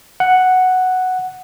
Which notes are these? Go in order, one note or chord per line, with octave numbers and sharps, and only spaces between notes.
F#5